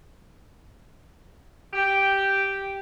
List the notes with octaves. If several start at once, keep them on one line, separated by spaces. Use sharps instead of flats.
G4